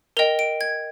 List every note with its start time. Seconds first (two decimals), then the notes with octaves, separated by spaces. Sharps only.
0.17 A#4 D#5 G5 F7
0.39 D7
0.61 G#6